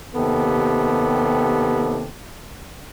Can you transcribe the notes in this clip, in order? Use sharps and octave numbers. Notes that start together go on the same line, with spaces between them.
D#2 C3 B3 G4 A4